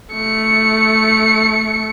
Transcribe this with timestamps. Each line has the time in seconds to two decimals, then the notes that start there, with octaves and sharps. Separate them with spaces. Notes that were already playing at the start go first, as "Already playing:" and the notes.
0.15 A3 C#7